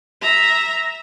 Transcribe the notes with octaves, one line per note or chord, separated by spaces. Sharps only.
E5 A#5